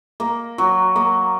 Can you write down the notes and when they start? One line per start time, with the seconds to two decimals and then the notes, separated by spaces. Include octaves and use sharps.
0.20 A#3
0.58 F#3
0.96 A#3